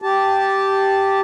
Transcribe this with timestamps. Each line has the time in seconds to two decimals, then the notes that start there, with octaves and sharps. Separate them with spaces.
0.02 G4 A5